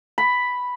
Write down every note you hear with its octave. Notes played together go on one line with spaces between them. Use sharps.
B5